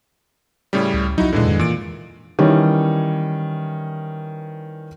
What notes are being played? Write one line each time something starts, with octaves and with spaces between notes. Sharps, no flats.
A2 C#3 G3
C#2
C2 F#3 D#4 E4 F#4
D#1 A#2 D3 E3 G#3
F2 G#2 D#3
A#2 E3 D7
D#3 E3 G3 C#4